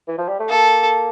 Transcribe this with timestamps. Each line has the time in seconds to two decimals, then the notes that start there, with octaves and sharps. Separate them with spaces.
0.08 E3
0.18 F3
0.28 G3
0.39 A3
0.49 A#3 A4